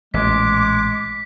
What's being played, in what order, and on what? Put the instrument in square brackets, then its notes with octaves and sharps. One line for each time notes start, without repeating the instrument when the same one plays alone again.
[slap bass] A1 A#2 [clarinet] G#3 [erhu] D6 [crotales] B6